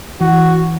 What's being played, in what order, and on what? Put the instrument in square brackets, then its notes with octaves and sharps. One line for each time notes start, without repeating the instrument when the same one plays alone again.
[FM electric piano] E3 [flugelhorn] F#4